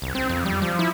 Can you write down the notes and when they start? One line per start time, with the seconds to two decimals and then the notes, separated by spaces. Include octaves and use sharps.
0.02 C2
0.15 C4
0.29 F2
0.46 G3
0.62 F3
0.79 E4